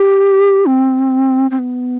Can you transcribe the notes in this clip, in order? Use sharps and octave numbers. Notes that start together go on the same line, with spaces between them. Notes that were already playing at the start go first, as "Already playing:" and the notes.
Already playing: G4
C4
C4
B3